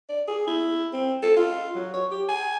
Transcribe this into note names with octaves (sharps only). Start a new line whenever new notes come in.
D5
G#4
E4
C4
A4
F4
F#3
C#5
G4
G#5